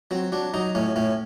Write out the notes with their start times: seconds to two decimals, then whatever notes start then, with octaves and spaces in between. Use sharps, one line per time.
0.11 F#3 C4
0.32 F#3 D4
0.54 F#3 D#4
0.75 A2 C#4
0.96 A2 C#4